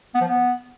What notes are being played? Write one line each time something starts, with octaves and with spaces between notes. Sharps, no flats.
B3
F3
B3